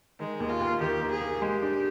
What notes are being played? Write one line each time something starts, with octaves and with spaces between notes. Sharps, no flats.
D#3 G#3
D#2
F4
D#2
D#3 G4
A#3
G#4
A#3
G#3 G4
D4